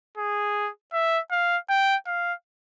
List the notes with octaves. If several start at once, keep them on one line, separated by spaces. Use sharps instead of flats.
G#4
E5
F5
G5
F5